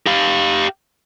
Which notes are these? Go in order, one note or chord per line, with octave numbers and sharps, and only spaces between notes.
G4 F5